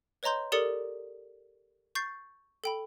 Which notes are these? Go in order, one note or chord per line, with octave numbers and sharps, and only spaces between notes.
B4 C#5 D#5 A#5 C6 G6
G4 A4 A#4 D5 D#6 C#7
C#6 G6 A6 C7
A4 G5 B5